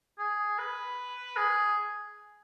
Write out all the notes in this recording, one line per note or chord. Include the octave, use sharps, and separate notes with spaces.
G#4
B4
G#4